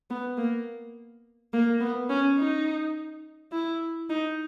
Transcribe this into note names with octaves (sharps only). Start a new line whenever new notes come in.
B3
A#3
A#3
B3
C#4
D#4
E4
D#4